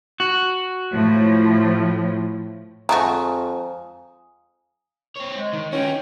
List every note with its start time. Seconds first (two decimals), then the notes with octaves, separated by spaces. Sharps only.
0.20 F#4
0.92 A2 F3
2.89 F2 G#3 A3 F#4 F5 G#5 A#5 D#6
5.16 C4 C#5
5.34 G#3
5.53 D#3
5.72 C#4 D#4 F#4 G5